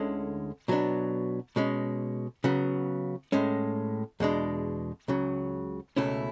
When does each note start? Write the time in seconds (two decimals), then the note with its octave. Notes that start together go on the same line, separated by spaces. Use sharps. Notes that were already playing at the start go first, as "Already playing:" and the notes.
Already playing: D2 D3 G#3 C#4 E4
0.68 B2 F#3 B3 D4
1.56 B2 G#3 C#4
2.44 C#3 F#3 B3
3.32 A2 G#3 C#4
4.20 E2 B2 G#3 D4
5.08 C#2 C#3 F#3
5.97 C#2 B2 A3 C#4 E4